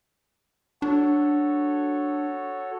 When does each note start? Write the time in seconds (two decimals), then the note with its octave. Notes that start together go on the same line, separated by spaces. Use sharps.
0.82 D4 F#4 A4 C#5